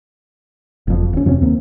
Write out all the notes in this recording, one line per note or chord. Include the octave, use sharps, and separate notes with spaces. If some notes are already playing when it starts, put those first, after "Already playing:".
F#1 F2
D#1 C#4
F2 C3 C4 C#4
D#2 A#3 C4